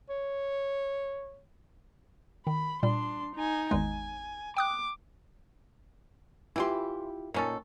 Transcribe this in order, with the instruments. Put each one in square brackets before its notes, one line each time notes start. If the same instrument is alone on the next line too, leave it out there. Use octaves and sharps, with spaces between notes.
[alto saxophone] C#5
[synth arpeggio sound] D#3 [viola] B5
[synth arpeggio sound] A#2 G3 [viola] D4 C6
[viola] D#4 G#5
[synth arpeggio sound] G#1 E2 G#3 [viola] G#5
[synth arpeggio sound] G5 D#6 F#6 [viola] D6
[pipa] E3 G5 C6 [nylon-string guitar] E4 F4 G4
[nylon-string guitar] A#2 D#4 [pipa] D#3 C#4 A4